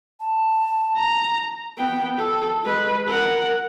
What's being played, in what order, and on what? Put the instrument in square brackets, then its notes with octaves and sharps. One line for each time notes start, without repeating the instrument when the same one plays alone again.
[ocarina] A5
[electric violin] A#5
[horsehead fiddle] B3 G5
A4
G#3 B4
A#4 F#5